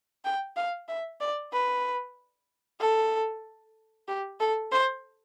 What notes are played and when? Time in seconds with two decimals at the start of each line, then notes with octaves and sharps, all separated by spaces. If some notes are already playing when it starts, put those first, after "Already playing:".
0.25 G5
0.57 F5
0.89 E5
1.21 D5
1.53 B4
2.80 A4
4.08 G4
4.40 A4
4.72 C5